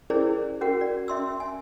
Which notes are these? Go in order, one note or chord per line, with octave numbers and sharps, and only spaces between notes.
C#4 E4 G#4 A#4 C5 D5
C#4 F#4 A#4 F#5 G5
D5
C#4 E5 C6 E6
G#5